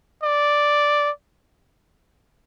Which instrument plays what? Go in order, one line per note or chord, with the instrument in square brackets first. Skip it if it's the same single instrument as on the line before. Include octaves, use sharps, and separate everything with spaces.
[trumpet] D5